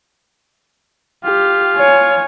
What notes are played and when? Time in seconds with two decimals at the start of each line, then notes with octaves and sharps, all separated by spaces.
1.24 F4 G4
1.77 C#5 G#5